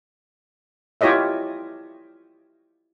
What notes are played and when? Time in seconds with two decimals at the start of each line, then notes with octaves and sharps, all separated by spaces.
1.01 E4 F4 G4 C#5 D#5 E5